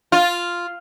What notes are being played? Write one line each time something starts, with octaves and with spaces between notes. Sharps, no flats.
F4